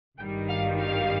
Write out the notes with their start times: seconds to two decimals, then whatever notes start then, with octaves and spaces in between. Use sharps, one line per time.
0.18 G#1 G2 D#3 G3 G5
0.48 F5
0.79 F5